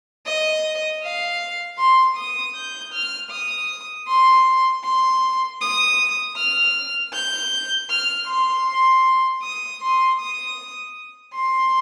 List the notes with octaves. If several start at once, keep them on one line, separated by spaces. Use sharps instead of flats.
D#5
F5
C6
D#6
G6
F6
D#6
C6
C6
D#6
F6
G6
F6
C6
C6
D#6
C6
D#6
C6